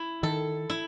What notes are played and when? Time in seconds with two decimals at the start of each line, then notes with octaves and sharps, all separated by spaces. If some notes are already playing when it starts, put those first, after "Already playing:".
Already playing: E4
0.23 D#3 A4
0.70 E4